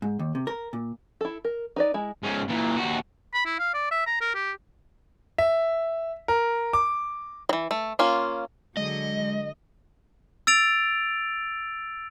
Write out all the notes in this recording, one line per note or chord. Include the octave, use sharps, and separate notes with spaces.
G#2
D#2
C3
A#4
A#2
E4 A4
A#4
D#4 B4 D5
G#3 E4
G#2 C#4
A#2 E3
D#2 F#4
B5
E4
F5
D5
E5
A#5
A#4
G4
E5
A#4
D6
E3 F#3
A3
A#3 C#4 F4
D3 F#3 G#3 D#5
E6 A6 D7 F7